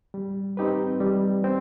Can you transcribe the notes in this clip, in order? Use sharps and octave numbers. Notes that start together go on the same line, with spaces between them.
G3
C4 D#4 G4 B4
G3
C4